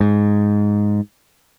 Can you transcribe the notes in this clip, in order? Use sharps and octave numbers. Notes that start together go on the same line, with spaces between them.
G#2